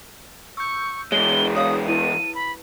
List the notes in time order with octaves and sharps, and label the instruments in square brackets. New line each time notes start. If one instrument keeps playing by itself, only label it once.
[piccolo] C#6 [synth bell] E6 G6
[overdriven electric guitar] E2 G#3 [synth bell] G#4 C#5 [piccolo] G7
[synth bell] G#4 C#5 F5 [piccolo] D#6
[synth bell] E4 B4 [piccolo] D#7
[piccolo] B5